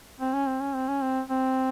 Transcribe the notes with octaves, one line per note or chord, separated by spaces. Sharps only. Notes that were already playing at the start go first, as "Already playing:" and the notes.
C4
C#4
C4
C#4
C4
C#4
C4
C4